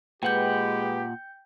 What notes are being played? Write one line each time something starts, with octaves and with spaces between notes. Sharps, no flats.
A#2 G#3 G4 B4 F#5 G5 G6